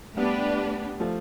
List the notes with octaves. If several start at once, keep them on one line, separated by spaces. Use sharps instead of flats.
G3 A3 B3 D4 G4 B4
F3 A3